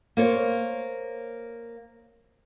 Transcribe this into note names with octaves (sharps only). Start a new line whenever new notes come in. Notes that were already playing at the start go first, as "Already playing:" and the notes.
A#3 C5 C#5